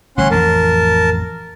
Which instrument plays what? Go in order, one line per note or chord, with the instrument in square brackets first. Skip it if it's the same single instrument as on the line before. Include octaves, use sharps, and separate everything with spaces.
[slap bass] A1 D3 G3 [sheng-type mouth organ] C#4 F#5 C6
[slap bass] A1 F2 E3 [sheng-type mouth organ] A#4 A5